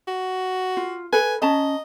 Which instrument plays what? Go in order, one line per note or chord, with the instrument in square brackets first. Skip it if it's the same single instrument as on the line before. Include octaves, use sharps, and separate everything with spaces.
[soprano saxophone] F#4
[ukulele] F4
[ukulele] A4 B4 [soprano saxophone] G#5
[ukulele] C#4 A5 A#5 [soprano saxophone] D#5